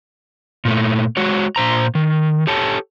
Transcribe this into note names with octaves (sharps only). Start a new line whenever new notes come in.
A#2 A3
G#3 F#4 C#5
A#2 C5 A#5
D#3
G4 A4 C#5 A5